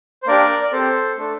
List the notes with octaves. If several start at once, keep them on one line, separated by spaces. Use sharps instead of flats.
C5
A#3 D4 G4 A#4 D5
D5
C4 G4 A4 C5
A3 D4 A4